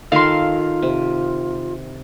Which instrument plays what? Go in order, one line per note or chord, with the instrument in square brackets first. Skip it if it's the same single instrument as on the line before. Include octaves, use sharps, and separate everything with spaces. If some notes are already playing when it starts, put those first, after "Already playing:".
[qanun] D#3 A4 A#4 [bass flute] F4 [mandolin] F5 C6
[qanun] C3